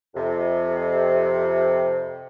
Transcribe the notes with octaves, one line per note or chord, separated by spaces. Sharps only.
F2 C3